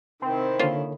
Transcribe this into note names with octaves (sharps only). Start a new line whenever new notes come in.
C3 D#3 C4 E4
D3 A#3 F4 A4 C5 C#5